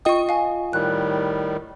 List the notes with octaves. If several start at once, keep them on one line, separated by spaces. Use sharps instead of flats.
F4 D#5 G5 C#6 D#6
F5 G#5
A2 D#3 G3 F#6